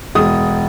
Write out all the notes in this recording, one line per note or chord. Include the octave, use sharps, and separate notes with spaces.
E1 D#6